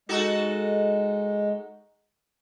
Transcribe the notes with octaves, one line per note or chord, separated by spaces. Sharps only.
G#3 D#4 F#4 A4